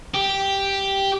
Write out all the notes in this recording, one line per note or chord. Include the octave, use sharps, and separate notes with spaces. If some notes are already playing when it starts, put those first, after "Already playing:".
G4